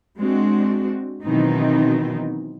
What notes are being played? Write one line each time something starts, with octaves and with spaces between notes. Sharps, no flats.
G#3 C4 D4 F#4
B2 D#3 E3 F#3 C4 D#4